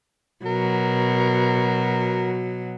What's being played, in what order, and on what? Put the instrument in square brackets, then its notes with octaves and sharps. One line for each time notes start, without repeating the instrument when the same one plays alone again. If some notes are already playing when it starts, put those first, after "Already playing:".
[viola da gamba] B2 F#3 [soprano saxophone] A#4